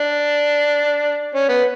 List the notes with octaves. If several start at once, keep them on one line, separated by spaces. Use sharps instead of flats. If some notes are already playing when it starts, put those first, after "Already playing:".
Already playing: D4
C#4
B3